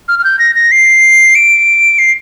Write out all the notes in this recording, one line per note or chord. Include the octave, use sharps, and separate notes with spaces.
F6
F6
G6
A#6
A#6
C7
D7
C7